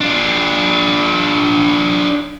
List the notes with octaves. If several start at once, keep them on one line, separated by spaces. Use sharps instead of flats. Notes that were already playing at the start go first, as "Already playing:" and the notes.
D4 F4